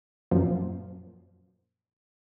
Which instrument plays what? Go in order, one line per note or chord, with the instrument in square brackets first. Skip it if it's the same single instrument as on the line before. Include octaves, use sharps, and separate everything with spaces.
[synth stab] F#2 A#2 F3